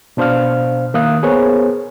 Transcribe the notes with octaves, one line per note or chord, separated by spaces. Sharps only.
B2 D4 C5 F5 F6
D#3 A#3 E5 F5 D#6 F#6
B3 G#4 A#4 C5 C#5